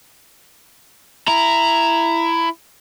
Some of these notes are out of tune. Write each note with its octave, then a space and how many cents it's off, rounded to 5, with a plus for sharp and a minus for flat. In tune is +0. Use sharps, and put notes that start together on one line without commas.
E4 +15 A#5 +0